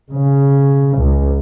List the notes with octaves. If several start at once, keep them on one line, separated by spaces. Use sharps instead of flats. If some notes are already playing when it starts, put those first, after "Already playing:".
C#3
C#2